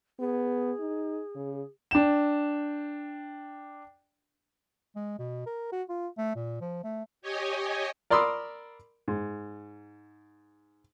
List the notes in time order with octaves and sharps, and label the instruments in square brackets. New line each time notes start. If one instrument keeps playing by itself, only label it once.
[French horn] B3 [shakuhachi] G#4
[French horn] D#4
C#3
[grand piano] D4 G5 E7
[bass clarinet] G#3
B2
A#4
F#4
F4
A3
A#2
F3
A3
[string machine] G4 C#5 D#5 G#5
[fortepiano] A#4 D5 B5 C6 D#6 E6
G#2